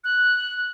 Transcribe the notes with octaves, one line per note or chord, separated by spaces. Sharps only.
F#6